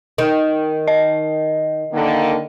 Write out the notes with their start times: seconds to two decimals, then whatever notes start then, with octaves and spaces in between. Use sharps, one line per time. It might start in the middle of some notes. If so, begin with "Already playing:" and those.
0.18 D#3
0.88 D#5
1.92 D3 D#3 A#3